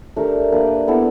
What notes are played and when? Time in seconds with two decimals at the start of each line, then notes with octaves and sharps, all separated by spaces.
0.16 A3 D4 G4 A#4
0.52 A#3 D4 G4 B4
0.88 B3 E4 A4 D5